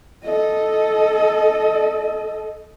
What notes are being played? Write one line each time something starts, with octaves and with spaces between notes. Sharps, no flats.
A4 D#5